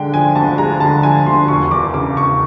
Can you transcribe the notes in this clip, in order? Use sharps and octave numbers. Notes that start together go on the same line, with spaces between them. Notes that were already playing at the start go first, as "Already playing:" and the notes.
Already playing: D3 G#3 G5
F3 G#5
D2 A5
G#3 A#5
D3 A5
F3 G#5
D2 C6
E1 C#6
E2 D6
C#3 D6
E1 C#6